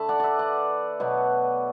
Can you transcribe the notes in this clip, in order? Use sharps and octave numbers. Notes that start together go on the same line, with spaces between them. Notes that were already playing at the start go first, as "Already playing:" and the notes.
Already playing: D3 A3 A5 B5
D5 F#5
B4 D5 E5
D5 F#5
B2 F#3 B3